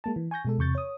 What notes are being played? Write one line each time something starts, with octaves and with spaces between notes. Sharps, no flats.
G#3 A#3 A5
E3
G#5 C#6 G6 A#6
B2 G#3 A4
E2 C3 C#6 G6 A6
C#5 D#6